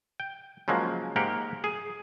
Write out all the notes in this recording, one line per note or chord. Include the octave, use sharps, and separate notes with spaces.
G5
C#3 F3 F#3 G#3 A#3
G#2 A#3 G4 A#4 F#5
G#4